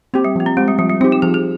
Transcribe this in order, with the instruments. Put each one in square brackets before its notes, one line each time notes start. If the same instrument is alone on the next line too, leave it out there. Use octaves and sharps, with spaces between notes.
[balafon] A#3 [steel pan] C4 G4
[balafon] G3
[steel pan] F3 [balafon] A#3
[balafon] C4
[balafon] G#3 [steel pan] C4 G4
[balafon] G3
[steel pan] F3 [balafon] G3
[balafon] G3
[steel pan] C4 [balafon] D#4
[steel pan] G4
[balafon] F4
[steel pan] F3 [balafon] G#4
[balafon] G#4